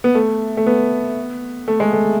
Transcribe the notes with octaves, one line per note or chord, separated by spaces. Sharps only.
B3
A3
A3
B3
A3
G#3
A3